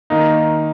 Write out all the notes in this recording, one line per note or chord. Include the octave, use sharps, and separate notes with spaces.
D#3 A#3 D#4